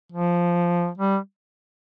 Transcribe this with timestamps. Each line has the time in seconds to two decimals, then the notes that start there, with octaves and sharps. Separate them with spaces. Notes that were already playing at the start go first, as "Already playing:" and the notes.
0.12 F3
0.98 G3